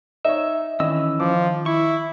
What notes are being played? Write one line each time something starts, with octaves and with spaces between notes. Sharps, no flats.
D#4 C#5 E5
D#3 E3 C#4 D#5 E6
F3 D6
E4 C#6